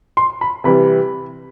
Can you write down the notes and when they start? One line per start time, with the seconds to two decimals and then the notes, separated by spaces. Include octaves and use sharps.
0.17 C6
0.41 B5
0.64 C3 E3 G3 B5